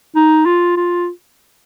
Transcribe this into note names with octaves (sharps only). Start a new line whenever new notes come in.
D#4
F4
F4